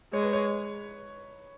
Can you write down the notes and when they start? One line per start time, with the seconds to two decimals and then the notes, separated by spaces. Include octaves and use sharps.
0.13 G#3 C#5
0.23 B4
0.33 C#5